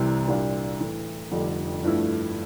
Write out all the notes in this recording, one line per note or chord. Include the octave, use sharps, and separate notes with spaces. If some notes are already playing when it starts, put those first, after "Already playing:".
Already playing: C2 C3 E3 G3
C2 A#2 G3 D4 F4
A2 E3 A3
F1 F2 D3 G3 D4
G2 F3 A3 E4